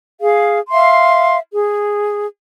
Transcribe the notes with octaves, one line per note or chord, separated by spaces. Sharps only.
G#4 F5
E5 F5 C6
G#4